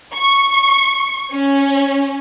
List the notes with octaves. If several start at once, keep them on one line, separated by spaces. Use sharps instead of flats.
C#6
C#4